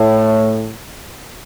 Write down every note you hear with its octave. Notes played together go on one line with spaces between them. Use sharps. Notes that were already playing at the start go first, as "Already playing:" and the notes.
Already playing: A2